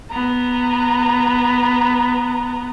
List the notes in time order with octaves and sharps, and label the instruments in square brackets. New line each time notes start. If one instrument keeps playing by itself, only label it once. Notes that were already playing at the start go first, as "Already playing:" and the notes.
[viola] B3 A#5